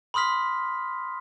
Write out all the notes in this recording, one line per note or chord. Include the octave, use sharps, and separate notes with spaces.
B5 C6 D#6 F6 B6